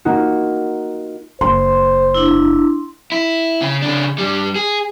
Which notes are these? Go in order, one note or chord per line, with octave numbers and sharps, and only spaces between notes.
A#3 D#4 F4 F#4
F#1 C5 C6
D4 E4
E4
C#3
C#3 D4
G2 G3
G#4